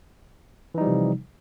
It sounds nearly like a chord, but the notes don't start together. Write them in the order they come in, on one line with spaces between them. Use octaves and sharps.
E3 D#4 G3 F3 C3